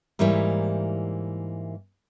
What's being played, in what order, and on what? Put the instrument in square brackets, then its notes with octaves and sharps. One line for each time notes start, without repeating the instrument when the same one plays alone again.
[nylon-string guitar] G#2 E3 G3 A#3 E4 C#5